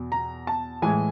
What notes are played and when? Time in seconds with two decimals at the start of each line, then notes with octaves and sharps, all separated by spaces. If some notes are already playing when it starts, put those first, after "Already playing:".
Already playing: E2 B2
0.12 A#5
0.47 A5
0.82 A2 E3 G#3 G#5